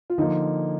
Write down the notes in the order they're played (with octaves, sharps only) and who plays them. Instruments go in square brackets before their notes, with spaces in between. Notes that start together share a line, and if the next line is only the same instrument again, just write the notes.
[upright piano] F4
[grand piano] D3 F3 A#3 [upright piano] D#4